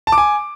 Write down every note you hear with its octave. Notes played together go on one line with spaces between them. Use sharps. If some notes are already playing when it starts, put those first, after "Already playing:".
A5
D6
G#5